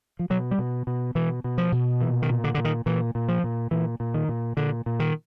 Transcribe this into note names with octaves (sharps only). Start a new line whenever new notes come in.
F3
B2 F#3
G3
B2
B2
B2 E3
B2
F3
B2
A#2 E3
D#3
A#2
D3
A#2 D3
D#3
A#2 E3
A#2
F3
A#2
A#2 E3
A#2
D#3
A#2
A#2 D3
A#2
D#3